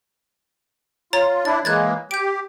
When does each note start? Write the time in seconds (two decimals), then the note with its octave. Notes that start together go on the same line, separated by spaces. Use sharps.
1.13 F4 C#5 A#5 A6
1.45 D4 E4 A6
1.65 E3 G#3 A#3 F#6 G#6 A6
2.11 G4 G6 D7